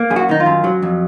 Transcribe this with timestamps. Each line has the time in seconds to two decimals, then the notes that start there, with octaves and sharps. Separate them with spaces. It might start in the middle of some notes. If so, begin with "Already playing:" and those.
Already playing: A#3
0.10 F#2 G#4
0.16 F#4
0.29 D#3 D#4
0.40 F4
0.46 F#2
0.64 F#3
0.82 F2